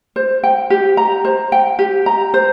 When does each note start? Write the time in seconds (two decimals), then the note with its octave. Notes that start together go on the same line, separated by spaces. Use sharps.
0.16 C5
0.43 G5
0.70 G4
0.97 A#5
1.25 C5
1.52 G5
1.79 G4
2.06 A#5
2.34 C5